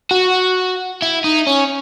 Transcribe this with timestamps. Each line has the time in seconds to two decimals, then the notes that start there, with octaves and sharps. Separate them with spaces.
0.11 F#4
1.02 E4
1.24 D#4
1.47 C#4